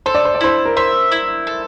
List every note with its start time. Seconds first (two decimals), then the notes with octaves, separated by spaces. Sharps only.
0.06 A4 C5
0.15 D5
0.25 C5
0.35 D5
0.41 E4 C5
0.65 A#4
0.77 C5 E5
1.12 E4
1.47 A4